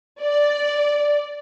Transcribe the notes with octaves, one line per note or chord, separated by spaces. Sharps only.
D5